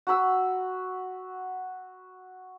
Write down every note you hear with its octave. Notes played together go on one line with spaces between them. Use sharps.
F#4 A#5 B5 E6